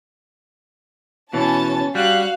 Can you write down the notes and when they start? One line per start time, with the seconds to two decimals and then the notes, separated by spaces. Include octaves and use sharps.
1.33 B2 E3 C#4 A5 A6
1.95 G3 F#4 F5 F#6